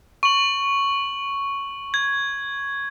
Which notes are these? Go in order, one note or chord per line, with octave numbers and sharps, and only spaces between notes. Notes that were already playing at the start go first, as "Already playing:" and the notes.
C#6 F#7
G#6